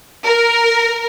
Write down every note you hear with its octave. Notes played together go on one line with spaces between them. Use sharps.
A#4